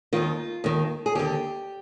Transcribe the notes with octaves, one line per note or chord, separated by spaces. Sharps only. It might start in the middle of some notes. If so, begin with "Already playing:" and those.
D#2 D#3 F4
D#2 D#3
G#4
D#2 D3 G4